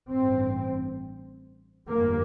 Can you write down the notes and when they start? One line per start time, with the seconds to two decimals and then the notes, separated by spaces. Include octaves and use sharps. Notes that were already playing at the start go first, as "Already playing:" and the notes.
0.12 A1 G2 C4
1.90 G1 F2 C3 A#3